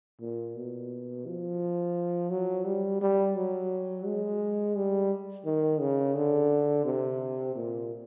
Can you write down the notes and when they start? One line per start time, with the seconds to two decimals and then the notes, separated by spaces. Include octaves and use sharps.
0.21 A#2
0.56 B2
1.26 F3
2.31 F#3
2.65 G3
3.01 G3
3.36 F#3
4.06 G#3
4.76 G3
5.45 D#3
5.81 C#3
6.16 D3
6.85 C3
7.56 A#2